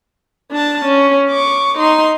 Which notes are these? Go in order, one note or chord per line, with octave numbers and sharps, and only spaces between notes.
D4 A5
C#4
C#6 D6
D#4 C6